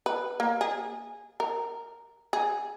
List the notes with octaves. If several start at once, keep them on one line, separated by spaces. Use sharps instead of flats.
B4
A#3
G#4
A#4
G#4